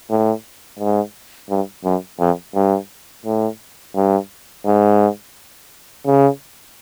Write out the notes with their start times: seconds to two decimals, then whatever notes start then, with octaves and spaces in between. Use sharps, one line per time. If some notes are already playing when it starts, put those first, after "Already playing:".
0.10 A2
0.79 G#2
1.50 G2
1.85 F#2
2.20 F2
2.55 G2
3.26 A2
3.95 G2
4.65 G#2
6.06 C#3